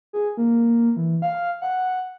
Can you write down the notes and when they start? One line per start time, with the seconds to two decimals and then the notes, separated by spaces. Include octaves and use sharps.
0.13 G#4
0.37 A#3
0.96 E3
1.22 F5
1.62 F#5